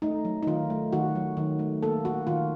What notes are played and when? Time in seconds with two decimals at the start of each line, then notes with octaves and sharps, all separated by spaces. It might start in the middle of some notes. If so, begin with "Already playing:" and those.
0.02 A3 D#4
0.25 F#3
0.43 D#4
0.47 D#3 F4
0.70 A3
0.93 D#3 F#4
1.15 F#3
1.37 D#3
1.59 A3
1.83 A#3 A4
2.05 A#3 F#4
2.27 D#3 F4